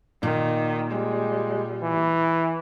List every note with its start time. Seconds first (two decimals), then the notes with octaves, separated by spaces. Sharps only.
0.23 A#2 D#3
0.92 G3 G#3
1.82 E3